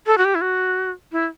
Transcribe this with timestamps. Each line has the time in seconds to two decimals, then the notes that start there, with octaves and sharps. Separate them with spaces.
0.07 A4
0.18 F#4
0.25 G4
0.35 E4
0.41 F#4
1.12 E4